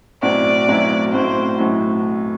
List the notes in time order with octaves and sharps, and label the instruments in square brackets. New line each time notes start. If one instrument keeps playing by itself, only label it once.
[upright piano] B1 A2 F#3 C4 E4 [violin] D5
[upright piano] B1 A2 F#3 C4 E4
[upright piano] B1 A2 F#3 C4 E4 [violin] C5
[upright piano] B1 A2 F#3 C4 E4